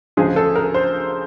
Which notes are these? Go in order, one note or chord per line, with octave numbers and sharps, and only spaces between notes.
D2 C#3 F3 G#3 G#4
A4
A#4
C5